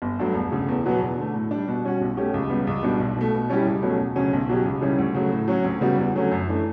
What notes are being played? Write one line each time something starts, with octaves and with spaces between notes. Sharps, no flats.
G1
G2 F#3 A3
E1
D2 C#3
E2
B2 F#3 B3
E2
D3 A3
A2
G3 D4
B2
G3 C#4 F#4
B1
B2 A3 C#4 G4
C#2
C#3 G3 B3
C#2
B2 G3 D4
B1
B2 A3
B2
G3 C#4 E4 G4
C#2
B2 F#3 A3 C#4
E1
D2 C#3 F#3 C#4
B1
B2 F#3 C#4 G4
C#2
C#3 G3 C#4 E4
D2
C#3 F#3 A3
A2
F#3 C#4 F#4
D2
C#3 G3 B3 F#4
E2
D3 F#3 A3 C#4
F#2
E3 A3 D4